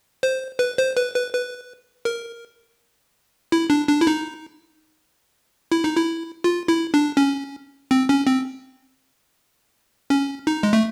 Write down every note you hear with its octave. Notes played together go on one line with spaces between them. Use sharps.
C5
B4
C5
B4
B4
B4
A#4
E4
D4
D4
E4
D#4
E4
D#4
E4
F4
E4
D4
C#4
C4
C#4
C4
C#4
D#4
G#3
A3